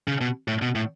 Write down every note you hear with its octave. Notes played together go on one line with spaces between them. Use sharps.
C#3
B2
A2
B2
A2